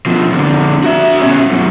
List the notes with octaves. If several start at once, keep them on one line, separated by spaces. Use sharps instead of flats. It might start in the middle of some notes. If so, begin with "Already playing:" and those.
B2 F3
F2 D3
F#4 E5
B2 C#4
F#2 B2